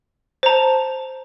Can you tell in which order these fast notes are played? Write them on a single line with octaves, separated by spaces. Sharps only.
C5 A#5 A5